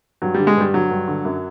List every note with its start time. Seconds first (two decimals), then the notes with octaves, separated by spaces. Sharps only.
0.22 G2 F#3
0.34 D3 G3
0.47 G#3
0.57 G2 G3
0.73 D3 F#3
0.91 G2
1.08 D3
1.25 F#2